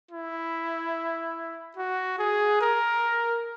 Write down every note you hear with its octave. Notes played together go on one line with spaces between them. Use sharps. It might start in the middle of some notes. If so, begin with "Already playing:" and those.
E4
F#4
G#4
A#4